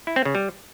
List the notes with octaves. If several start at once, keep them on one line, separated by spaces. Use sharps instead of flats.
E4
C4
C#3
G3